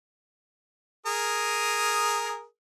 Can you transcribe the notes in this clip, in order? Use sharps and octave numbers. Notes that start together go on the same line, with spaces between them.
G#4 A#4 D#6